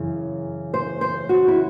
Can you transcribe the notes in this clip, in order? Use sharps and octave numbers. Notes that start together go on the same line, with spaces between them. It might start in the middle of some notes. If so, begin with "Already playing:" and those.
Already playing: F#2 C#3 E3
C5
C5
F#4
E4